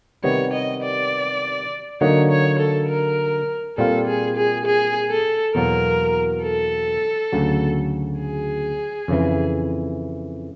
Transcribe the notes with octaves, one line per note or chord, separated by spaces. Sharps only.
C3 D#3 G3 B3 C#5
D#5
D5
D3 F#3 A#3 D#4 F#4 C#5
C#5
A4
A#4
A#2 G3 C4 F4 A4
G#4
G#4
G#4
A4
E2 B2 F#3 A#3 A#4
A4
D2 C#3 F#3
G#4
F2 C#3 E3